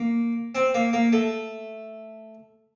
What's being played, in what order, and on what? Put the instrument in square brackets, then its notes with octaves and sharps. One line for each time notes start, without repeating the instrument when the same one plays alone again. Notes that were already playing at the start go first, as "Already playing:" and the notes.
Already playing: [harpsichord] A#3
C4
A#3
A#3
A3